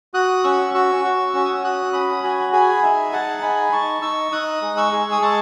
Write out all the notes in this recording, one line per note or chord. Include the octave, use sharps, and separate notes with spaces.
F#4 D#6 F#6
C#4 C#6 E6
F#4 C#6 E6
F#4
C#4 C#6
D#6
E6
F#4 D#6 F#6
C#4 B5 D#6
F#4 G#5 B5
G#4 G#5 B5
D#4 E5 G#5
G#4 F#5 A5
A5
D#4 G#5 B5
D#4 A5 C#6
D#4 C#6 E6
D#4 D#6 F#6
G#3
C#6 E6
G#4
D#6
G#3 A5 C#6